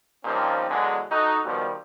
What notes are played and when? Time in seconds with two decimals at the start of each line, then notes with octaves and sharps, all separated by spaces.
0.25 A#2 F3 G3 C4 C#4 D#4
0.70 E2 D3 F#3 G#3
1.12 D#4 F#4 A4
1.45 B2 D#3 F3 G3